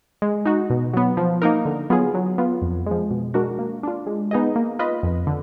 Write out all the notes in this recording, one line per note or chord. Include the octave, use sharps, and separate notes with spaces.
G#3
D#4 F#4
B2
F#3 B3
F3
A#3 D#4 A#4
D3
F#3 B3 F4 G#4
F#3
B3 F4
F2
F3 G#3
B2
G#3 D4 F#4 A#4
A#3
D4 F4
G#3
B3 D#4 G#4 D#5
A#3
F4 B4 D#5
F2
D3